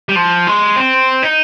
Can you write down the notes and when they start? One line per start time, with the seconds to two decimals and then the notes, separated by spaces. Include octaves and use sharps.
0.09 G3
0.16 F3
0.47 G#3
0.76 C4
1.23 D#4